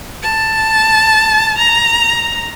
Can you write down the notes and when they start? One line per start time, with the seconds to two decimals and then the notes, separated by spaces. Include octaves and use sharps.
0.22 A5
1.58 A#5